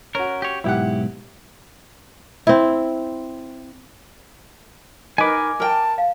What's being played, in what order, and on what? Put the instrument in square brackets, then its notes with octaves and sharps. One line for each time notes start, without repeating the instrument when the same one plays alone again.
[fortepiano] C#4 F#4 [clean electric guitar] A#4
[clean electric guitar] G4 C#5
[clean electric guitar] B1 G#2 [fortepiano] E4 G4 F#5
[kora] C4 E4
[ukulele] D#4 B4 [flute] A#4 [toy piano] D#5 [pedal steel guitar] G#5 D6
[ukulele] A#4 G5 [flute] A5
[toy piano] F5